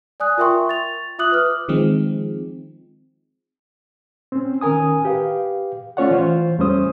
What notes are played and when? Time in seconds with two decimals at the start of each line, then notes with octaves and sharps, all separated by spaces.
0.20 D5 G#5 D#6 F#6
0.38 F4 A#4 E5 G5 C6 C#6
0.69 A6 F7
1.19 F4 E5 D6 D#6 F#6 F#7
1.32 B4 D6 F6
1.68 D#3 F3 G#3 C4
4.32 C4 C#4
4.61 D#3 C#4 A#4 G#5 D#6
5.05 G4 B4 F5
5.97 A3 C#4 F4 C#5 D5 F#5
6.11 E3 F4 C5
6.58 E2 G3 A3 C#4 C5 D#6